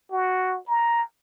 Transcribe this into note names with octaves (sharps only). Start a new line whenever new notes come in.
F#4
A#5